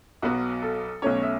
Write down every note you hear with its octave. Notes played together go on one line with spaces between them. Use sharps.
B1 B2 F#3 B3 F#4
A4
B1 B2 A3 C#4 C#5
E5